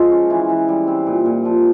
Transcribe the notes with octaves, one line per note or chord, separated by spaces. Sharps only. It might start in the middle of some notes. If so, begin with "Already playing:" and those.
Already playing: F3 G#3 F4
C#4
E3
E3
G3
C4
A#2
A#2
F3